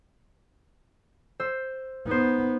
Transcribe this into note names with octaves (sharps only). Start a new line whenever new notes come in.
C5 E6
B3 D#4 C5